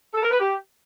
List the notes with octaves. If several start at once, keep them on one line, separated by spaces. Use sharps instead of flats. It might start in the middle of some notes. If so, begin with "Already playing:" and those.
A4
A#4
B4
G4